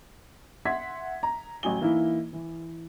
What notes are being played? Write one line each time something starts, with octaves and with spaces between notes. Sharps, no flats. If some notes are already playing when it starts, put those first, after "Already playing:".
E5 F#5 C6 G#6 B6
A#5
A1 F#3 G#5 G7
E3 A#3 D#4 E4
E3